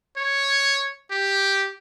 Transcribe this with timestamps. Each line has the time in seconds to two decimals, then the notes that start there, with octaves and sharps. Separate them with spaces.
0.17 C#5
1.11 G4